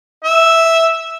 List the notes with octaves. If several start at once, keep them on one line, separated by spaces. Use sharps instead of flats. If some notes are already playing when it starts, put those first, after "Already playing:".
E5